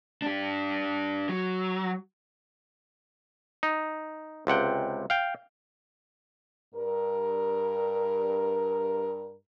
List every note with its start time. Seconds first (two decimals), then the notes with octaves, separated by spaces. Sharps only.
0.22 D4 G4
1.29 F#3
3.63 D#4
4.47 C#2 C3 F#5 G5
5.10 F5 G5
6.75 G2 A#4